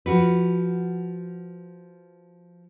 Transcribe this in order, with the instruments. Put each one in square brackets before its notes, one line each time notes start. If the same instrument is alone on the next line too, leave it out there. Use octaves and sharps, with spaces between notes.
[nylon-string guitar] F3 F#4 B4